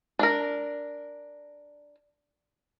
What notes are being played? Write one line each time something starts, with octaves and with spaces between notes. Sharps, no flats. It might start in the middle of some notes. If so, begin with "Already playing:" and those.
D4 A#4